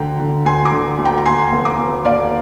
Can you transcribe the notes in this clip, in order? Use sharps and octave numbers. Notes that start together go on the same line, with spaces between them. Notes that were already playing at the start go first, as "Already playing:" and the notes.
Already playing: D2 D3 G5 A#5
D3
D2 G#5 C6
A#5 D6
D3
D2
G5 A#5
A#5
D#2 G#5 C6
F1
A#5 D6
F1
D#2 D5 F5